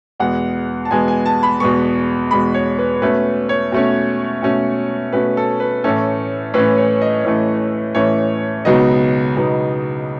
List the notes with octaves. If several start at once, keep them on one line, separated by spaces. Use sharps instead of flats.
E2 B2 G#3 B3 F#5
A5
E2 B2 G#3 B3 G#5
G#5
A5
B5
E2 B2 G#3 B3 C#6
E2 B2 G#3 B3 B5
C#5
B4
B2 A3 C#4 B4
C#5
B2 A3 C#4
B2 A3 C#4
B2 A3 C#4 B4
A4
B4
A2 E3 A3 C#4 A4
A2 E3 A3 C#4 B4
C#5
D#5
A2 E3 A3 C#4
A2 E3 A3 C#4 C#5
C#2 B2 F#3 B3 D#4 D#5
C#2 B2 F#3 B3 D#4